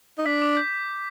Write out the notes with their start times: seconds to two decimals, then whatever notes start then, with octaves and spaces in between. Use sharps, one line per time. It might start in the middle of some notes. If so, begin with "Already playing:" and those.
0.18 D#4
0.26 D4 B6
0.42 D6
0.57 G6